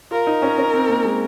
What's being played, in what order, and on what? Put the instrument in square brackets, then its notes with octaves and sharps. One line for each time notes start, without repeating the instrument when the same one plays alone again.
[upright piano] F4 [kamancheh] A#4
[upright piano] D#4
C#4
C#4
C4
A#3
G#3